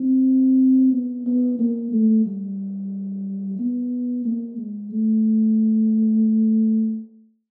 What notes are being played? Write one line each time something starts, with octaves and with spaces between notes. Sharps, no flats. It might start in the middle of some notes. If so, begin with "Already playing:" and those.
Already playing: C4
B3
B3
A#3
A3
G3
B3
A#3
G#3
A3